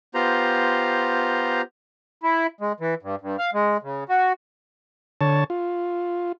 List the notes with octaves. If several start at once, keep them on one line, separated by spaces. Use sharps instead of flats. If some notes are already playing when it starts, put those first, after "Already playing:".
B3 F4 G4 C5 A#5
E4
G#3
E3
G2
G2
F5
G#3
C#3
F#4
D3 C#5 A5
F4